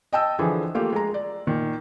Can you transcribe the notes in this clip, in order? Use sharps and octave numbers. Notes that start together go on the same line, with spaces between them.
D#5 G5 A5 E6
D3 E3 F3 G#4
A3 A#3 F4 G4
G#3 A#5
D5
A#2 D#3